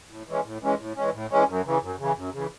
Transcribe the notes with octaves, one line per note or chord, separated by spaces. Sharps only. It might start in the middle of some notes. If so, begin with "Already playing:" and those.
A2
E3 G#3 C#4
A2
E3 G#3 C#4
A2
E3 G#3 C#4
A2
E3 G#3 C#4
F#2
C#3 E3
F#2
C#3 E3
F#2
C#3 E3